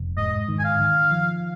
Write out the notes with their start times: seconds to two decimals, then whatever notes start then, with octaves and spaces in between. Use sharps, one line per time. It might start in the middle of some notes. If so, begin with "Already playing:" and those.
Already playing: F1
0.17 G#2 D#5
0.48 D#3
0.59 G#5
0.64 F5
0.80 D#3
1.11 F3